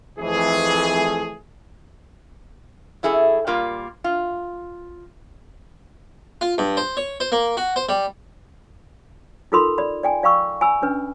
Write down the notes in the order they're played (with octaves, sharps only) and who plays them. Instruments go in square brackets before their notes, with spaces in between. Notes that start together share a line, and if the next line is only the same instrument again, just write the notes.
[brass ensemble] F2 E3 A3 G#4
[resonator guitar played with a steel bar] F#2 E4 G#4 A4 E5
A#2 G3 A#3 F4
F4
[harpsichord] F4
G2
C5
C#5
C5
A#3
F#4
C5
G3
[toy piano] D#4 F4 A4 A#4 B5 C6
D5 B5
D5 G5 G#5
D5 F5 G5 B5 C#6 E6
G#5 B5 E6
C#4 D4 B4